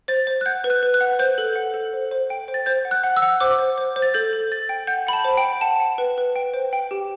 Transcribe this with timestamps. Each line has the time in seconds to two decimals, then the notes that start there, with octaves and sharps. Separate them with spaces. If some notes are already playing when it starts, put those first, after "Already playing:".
0.08 C5 A6
0.27 C5
0.41 F#6
0.46 F#5 G6
0.64 B4
0.70 F#6
0.83 B4
0.94 F#6
1.01 F#5
1.19 C5 G6
1.38 A4
1.56 F#5
1.74 A4
1.93 C5
2.11 C5
2.30 G5
2.48 C5
2.54 A6
2.66 C5 G6
2.85 F#5
2.91 F#6
3.04 F#5
3.17 E6
3.22 F#5
3.40 C5 D6
3.59 C5
3.78 C5
3.96 C5
4.02 A6
4.14 A4 G6
4.33 A4
4.51 A4 A6
4.69 G5
4.87 F#5 G6
5.07 F#5 B5
5.13 A5
5.25 C5
5.37 G5
5.43 F#5
5.61 F#5 A5
5.80 F#5
5.98 B4
6.18 B4
6.36 G5
6.54 C5
6.73 G5
6.91 G4